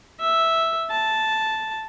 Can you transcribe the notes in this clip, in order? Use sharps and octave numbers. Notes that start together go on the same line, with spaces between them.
E5
A5